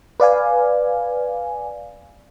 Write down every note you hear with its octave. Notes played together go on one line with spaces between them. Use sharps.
B4 D5 F5 G#5